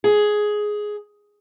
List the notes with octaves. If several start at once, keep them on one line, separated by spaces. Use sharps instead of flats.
G#4